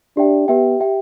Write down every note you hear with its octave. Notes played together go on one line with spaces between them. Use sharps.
D4 G4 E5 G5
B3 G4 E5 G5
G4 E5 G5